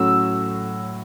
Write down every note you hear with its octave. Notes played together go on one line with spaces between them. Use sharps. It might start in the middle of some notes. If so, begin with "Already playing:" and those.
Already playing: A2 F#3 A3 C#4 F#4 E6